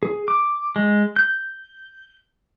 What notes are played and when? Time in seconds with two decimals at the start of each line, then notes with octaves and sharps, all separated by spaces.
0.03 G#4
0.28 D6
0.76 G#3
1.16 G6